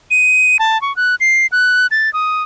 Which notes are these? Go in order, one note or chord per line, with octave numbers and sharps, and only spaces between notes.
D#7
A5
C#6
F#6
C7
F#6
A6
D#6